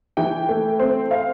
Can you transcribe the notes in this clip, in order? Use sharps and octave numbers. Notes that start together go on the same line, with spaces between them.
E3 G5
A3
C4
F5